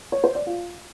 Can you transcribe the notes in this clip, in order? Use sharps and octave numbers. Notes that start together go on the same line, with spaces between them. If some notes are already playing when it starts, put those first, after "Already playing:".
C#5
C5
D5
F4